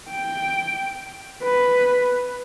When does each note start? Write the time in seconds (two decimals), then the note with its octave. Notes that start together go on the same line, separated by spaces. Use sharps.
0.11 G5
1.44 B4